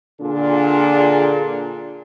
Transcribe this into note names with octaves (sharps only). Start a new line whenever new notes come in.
A#2 D3 D4 F4 G#4